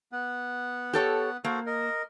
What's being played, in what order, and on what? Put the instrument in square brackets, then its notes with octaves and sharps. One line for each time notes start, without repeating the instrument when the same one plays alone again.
[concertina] B3 F#5
[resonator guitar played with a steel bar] G4 A4 C#5
[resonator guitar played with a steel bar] A#3 [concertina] F#4 A4 C5
[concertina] A#4 D#5